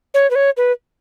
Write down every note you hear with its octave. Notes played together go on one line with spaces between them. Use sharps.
C#5
B4
C#5
B4